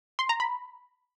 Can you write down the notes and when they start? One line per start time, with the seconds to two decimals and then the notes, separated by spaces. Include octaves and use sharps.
0.19 C6
0.29 A#5
0.40 B5